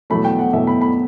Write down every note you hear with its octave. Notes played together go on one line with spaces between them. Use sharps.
E2 B2 F#3 A3 B5
G5
F#5
E2 B2 F#3 A3 E5
B5
B5